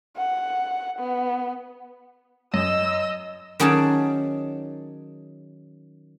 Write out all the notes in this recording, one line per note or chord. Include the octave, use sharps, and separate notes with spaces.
F#5
B3
F#2 D#5 E6
D#3 F#3 C#4 G#4 D5 A5